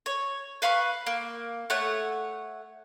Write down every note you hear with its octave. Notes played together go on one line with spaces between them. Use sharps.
C#5
B4 F5 B5 C#6
A#3
A3 C#5 F#5